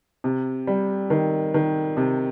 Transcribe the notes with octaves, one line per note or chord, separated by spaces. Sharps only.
C3
G3
D#3
D#3
C3